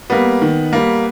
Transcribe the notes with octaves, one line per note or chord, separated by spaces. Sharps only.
G3 A#3 B3
D#3
G3 A#3